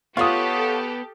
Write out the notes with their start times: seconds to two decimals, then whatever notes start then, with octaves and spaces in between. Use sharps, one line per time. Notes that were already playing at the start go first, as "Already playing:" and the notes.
0.17 B3 F4 G4 A4 C#5 F#5 D#6